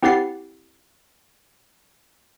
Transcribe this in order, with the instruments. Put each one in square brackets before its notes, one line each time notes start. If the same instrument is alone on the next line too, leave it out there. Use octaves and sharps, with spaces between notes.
[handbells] C4 E4 G4 F#5 A6 C7